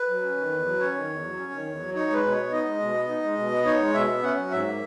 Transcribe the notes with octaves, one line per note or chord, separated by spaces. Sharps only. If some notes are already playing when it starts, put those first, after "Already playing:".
Already playing: B4
F#3
C#4
D#3
E2
F#3
C#4 C#5
D#3
E2
F#3
C#4
D#3
E2
F#3
D#4 C#5
G#3 B4
B2
C#5
B3
D#4 D#5
G#3
B2
B3
D#4
G#3
B2
B3
D#4 C#5
G#3
B2 E5
B3
C#4 F#5
F#3
G#2 E5
A#3